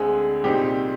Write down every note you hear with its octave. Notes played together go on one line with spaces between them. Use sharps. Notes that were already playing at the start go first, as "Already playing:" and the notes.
Already playing: D2 D3 G#3 C4 G#4
C2 A#2 G3 C4 D#4 G4